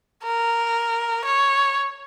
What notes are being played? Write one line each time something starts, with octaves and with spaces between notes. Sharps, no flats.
A#4
C#5